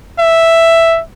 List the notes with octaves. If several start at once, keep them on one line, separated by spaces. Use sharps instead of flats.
E5